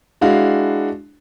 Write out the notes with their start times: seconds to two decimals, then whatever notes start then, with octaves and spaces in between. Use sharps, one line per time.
0.21 G#3 D4 E4 F#4 F5